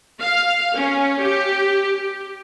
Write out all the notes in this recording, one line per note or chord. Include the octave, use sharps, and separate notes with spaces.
F5
C#4
G4